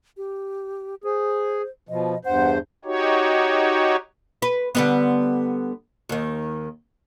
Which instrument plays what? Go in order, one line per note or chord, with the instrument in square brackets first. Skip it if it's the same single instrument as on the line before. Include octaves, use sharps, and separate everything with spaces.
[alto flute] G4
[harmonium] G#4 [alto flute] C5
[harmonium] B2 F3 [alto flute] D#5
[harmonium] E2 G2 C5 [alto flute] F#5
[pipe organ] D#4 F#4 G4 C#5
[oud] B4
D3 G3 B3
D#2 D#3